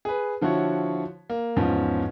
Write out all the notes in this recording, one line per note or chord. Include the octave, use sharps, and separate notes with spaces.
G#4 B4
D3 F3 E4 F#4 C#5
A#3
E2 G#2 F3 C#4